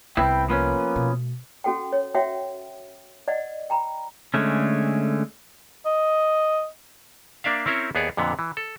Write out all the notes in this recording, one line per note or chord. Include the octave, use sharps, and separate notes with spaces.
C2 B3 C4 E4 G5
F3 A#3 B3 C#4
B2 A3
C#4 F#4 A4 F#5 G5
C#5
F#4 C#5 E5 F#5 G5
D5 D#5 F#5
G5 A#5 B5
D3 G#3 A3 C#4
D#5
A#3 D4 D5 E5 F5
C4 C#4 E4 A#4 C5 C#5
D#2 B3 G#4 C#5 D5
F2 A#2 D3 B3
E3
A4